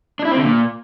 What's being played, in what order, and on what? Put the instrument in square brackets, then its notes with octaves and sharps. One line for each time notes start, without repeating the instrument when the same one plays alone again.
[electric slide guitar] D4
E4
C4
D3
A#2